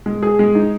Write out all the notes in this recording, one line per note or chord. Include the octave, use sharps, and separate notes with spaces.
G#3
G#4
G#3
D#4